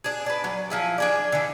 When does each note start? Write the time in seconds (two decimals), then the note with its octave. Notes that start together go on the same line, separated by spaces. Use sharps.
0.04 D4 G#4
0.26 B4 D5
0.44 F#3
0.70 F3 E4 G#4
0.98 D4 G#4 D5
1.32 D3 E3